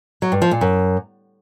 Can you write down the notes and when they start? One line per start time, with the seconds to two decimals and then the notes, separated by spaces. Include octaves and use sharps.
0.22 F#3
0.32 G2
0.42 F3
0.51 A#2
0.61 F#2